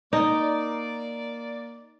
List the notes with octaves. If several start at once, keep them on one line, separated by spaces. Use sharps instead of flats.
A#3 D#4 D5